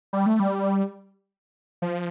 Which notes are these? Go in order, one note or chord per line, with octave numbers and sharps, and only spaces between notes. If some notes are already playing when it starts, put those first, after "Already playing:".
G3
A3
G3
F3